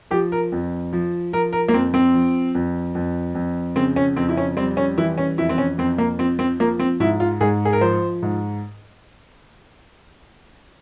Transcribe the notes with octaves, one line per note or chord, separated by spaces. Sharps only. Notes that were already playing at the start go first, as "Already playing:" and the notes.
F3 G4
A#4
F2
F3
F3 A#4
A#4
A#3
F2 C4
C4
F3
F2
F2
F2
C#3 C4
C#4
F2 C4
E4
C#4
G3 C4
C#4
E3 E4
C#4
F2 E4
C4
C#4
F2 C4
A#3
F3 C4
C4
F3 A#3
C4
G#2 E4
F4
G#2 G#4
G#4
A#4
F3 C5
G#2